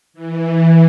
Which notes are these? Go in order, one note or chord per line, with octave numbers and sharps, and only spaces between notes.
E3